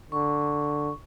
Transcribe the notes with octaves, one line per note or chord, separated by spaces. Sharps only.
D3 C#6